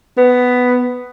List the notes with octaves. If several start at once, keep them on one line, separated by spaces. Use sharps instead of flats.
B3